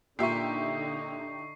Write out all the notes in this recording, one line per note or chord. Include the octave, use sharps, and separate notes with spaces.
A#2 D3 D#4 G4 E5 C#6 C7